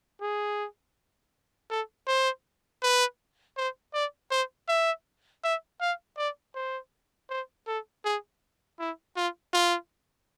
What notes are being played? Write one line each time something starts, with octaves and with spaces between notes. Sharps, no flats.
G#4
A4
C5
B4
C5
D5
C5
E5
E5
F5
D5
C5
C5
A4
G#4
E4
F4
F4